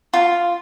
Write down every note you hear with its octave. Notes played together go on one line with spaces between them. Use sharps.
F4